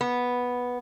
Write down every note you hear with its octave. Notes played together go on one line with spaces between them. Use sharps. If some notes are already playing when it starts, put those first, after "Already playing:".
B3